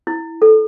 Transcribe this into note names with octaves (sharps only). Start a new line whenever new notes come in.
E4
A4